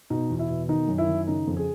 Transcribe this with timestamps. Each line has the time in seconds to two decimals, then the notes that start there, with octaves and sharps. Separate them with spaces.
0.10 B2 D#4
0.30 E2
0.39 E4
0.49 B2
0.69 D#3 D#4
0.88 F#2
0.98 E4
1.08 D#3
1.27 C#3 D#4
1.47 F2
1.57 G#4